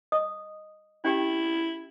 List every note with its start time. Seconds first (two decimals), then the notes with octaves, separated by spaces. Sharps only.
0.12 D#5 D#6
1.04 C#4 E4 G4 G5